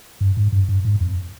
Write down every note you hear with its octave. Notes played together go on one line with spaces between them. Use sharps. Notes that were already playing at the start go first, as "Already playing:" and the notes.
G2
G#2
G2
G2
G#2
F2